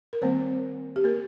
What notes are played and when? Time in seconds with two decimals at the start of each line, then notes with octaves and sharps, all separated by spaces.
0.13 A#4
0.22 D#3 G3 A#3 C4 C5
0.96 G4
1.04 A#3 A#4